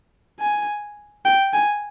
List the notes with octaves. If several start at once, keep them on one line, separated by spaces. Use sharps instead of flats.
G#5
G5
G#5